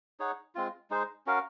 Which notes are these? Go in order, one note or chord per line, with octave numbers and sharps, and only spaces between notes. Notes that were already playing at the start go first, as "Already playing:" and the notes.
D#4 G#4 C#5 F#5
G#3 C4 F4
G#3 D#4 G#4 C5
C#4 F#4 A#4 F5